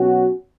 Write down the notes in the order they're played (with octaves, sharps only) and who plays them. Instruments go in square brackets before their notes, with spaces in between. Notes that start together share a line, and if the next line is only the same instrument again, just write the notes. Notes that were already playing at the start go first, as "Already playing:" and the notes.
Already playing: [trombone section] B2 F#3 C#4 F#4